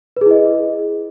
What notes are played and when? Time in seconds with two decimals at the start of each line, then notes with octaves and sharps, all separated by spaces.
0.17 B4
0.21 G#4
0.26 E4
0.31 D#5